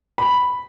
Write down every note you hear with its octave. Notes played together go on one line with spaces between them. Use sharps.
B5